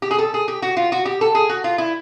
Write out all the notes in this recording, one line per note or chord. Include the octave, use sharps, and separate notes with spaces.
G4
G#4
A4
G#4
G4
F#4
F4
F#4
G4
A4
G#4
F#4
F4
E4